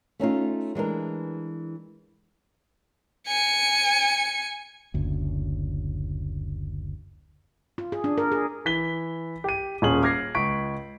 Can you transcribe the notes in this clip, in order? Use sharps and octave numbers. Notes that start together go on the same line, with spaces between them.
A3 C#4 D#4 F4
E3 G#3 D4 A#4
G#5 C#7
F#1 D2
F4
G#4
D4
A#4
G#4
E3 B6 G7
G4 D#7
D#1 C#4 G#4 F#7
D6 F6 G#6 A#6 C7
C#2 C#6 B6 D7